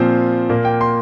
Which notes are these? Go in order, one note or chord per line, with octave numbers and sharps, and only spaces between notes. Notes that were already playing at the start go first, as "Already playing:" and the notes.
Already playing: A#2 F3 C4
A#2 A#3
G5
C6